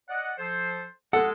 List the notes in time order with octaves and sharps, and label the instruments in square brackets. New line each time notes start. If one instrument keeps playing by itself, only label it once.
[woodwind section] D5 D#5 F#5
F3 A4 C5
[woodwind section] G#3 [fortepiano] A4 [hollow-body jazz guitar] F#5